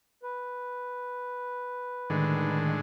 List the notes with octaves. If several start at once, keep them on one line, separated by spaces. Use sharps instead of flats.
B4
A2 D3 D#3 G#3